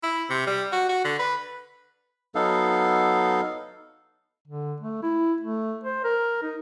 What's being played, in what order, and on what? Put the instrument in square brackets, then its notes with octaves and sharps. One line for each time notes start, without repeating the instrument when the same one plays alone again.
[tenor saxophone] E4
C3
G3
F#4
F#4
D3
B4
[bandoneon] F#3 B3 D#4 A4 F5
[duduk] D3
A3
E4
A3
C5
A#4
D#4